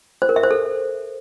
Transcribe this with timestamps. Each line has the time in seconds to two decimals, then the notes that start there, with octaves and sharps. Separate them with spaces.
0.22 C5
0.29 A#4
0.36 E5
0.43 C5
0.51 A4